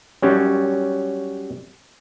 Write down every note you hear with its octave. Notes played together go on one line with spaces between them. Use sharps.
F#3 G3 C#4